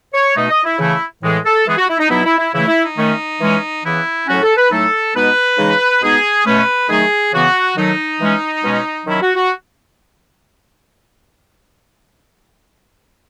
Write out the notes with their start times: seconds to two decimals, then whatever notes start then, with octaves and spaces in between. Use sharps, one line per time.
0.14 C#5
0.36 B2 A3 D#4 D#5
0.50 D#5
0.65 E4
0.79 C#3 E3 A3 E4
1.23 A2 E3 G#3
1.45 A4
1.67 E3 G#3 B3 G#4
1.77 F#4
1.88 E4
1.99 D#4
2.10 B2 F#3 B3 D#4 E4
2.25 E4
2.39 E4
2.53 C#3 E3 A3 E4
2.68 E4
2.83 D#4
2.97 D#3 A3 C#4
3.40 E3 G#3 C#4
3.84 C#3 E3 B3 E4
4.28 A2 F#3 C#4 F#4
4.43 A4
4.57 B4
4.71 A2 F#3 A3 D#4 A4
5.15 B2 G#3 B3 D#4 B4
5.58 C#3 E3 G#3 D#4
6.02 B2 G#3 B3 D#4 G#4
6.45 B2 A3 C#4 B4
6.89 D#3 F#3 A3 D#4 G#4
7.32 C#3 E3 B3 F#4
7.76 D#3 F#3 A3 D#4
8.20 E3 G#3 C#4
8.64 B2 G#3 C#4
9.06 D#3 F#3 C#4 E4
9.21 F#4
9.36 F#4